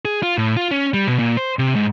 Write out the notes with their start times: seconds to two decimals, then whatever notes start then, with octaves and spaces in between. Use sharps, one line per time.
0.05 G#4
0.23 F4
0.38 A2
0.57 F4
0.71 C#4
0.94 G3
1.07 B2
1.19 A#2
1.37 C5
1.59 C3
1.75 G#2